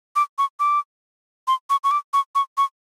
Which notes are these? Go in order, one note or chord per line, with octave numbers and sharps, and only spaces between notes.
D6
C#6
D6
C6
C#6
C#6
D6
C#6
C#6
C#6